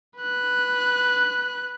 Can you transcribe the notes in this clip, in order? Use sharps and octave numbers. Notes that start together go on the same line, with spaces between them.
B4 F#6